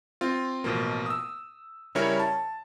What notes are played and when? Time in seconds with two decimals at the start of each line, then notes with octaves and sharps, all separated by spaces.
0.21 C4 F4
0.64 A1 B2 F3 A#3
1.06 D#6 E6
1.95 C#3 G3 C#4 E4 A#4 C#5
2.19 A5